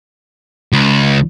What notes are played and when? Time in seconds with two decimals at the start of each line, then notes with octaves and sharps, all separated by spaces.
0.72 C#2